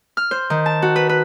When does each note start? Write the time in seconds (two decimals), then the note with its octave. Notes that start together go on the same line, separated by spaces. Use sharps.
0.17 F6
0.31 C5
0.50 D#3
0.66 A5
0.82 F#4
0.96 B4
1.09 B4